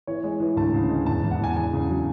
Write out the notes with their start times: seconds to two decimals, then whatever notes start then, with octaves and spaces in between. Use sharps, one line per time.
0.07 E3 C#5
0.24 G#3
0.40 E3
0.56 D2 A5
0.74 C#3
0.89 G#3
1.06 E2 A5
1.23 E2
1.31 F#5
1.39 E2 G#5
1.56 E2 G#5
1.73 C#3
1.89 F#3